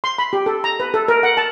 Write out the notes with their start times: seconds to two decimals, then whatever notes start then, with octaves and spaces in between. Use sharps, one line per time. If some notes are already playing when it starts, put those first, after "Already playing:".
0.04 C6
0.18 B5
0.33 G4
0.46 A4
0.64 A#5
0.80 B4
0.94 A4
1.08 A#4
1.23 F#5
1.37 A5